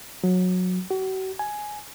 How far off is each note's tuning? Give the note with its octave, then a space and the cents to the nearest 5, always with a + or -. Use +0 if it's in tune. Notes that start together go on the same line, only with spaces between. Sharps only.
F#3 -20
F#4 +40
G#5 +10